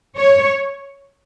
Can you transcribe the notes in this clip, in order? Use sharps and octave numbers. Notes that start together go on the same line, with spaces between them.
C#5